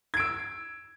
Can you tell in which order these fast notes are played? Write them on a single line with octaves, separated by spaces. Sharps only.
G#6 D7 E6